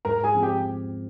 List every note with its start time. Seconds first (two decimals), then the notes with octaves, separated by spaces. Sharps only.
0.05 G#2 A#4 A#5
0.24 G#4 G#5
0.34 F3 C4
0.43 G4 G5